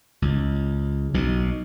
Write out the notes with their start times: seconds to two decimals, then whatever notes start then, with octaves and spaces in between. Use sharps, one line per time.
0.22 C#2
1.14 B1 B2